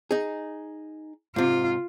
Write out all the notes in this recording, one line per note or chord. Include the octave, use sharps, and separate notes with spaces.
D#4 G#4
G#2 C3 F4